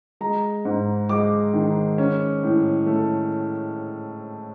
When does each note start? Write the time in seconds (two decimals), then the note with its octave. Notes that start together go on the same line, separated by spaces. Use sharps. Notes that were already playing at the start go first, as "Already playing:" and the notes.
0.21 G#3 A#5
0.65 G#2
1.09 G#3 D6
1.53 D#3
1.98 C#4
2.43 A2
2.86 A3